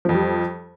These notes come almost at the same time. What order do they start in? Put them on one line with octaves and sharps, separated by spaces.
F3 F2 G3